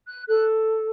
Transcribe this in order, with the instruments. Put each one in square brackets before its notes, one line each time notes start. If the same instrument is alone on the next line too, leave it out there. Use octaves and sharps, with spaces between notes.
[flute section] F#6
A4 F#6